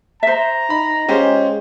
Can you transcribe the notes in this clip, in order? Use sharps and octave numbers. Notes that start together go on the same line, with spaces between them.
C5 E5 A#5
D#4 B5
G#3 C#4 F4 G4 C5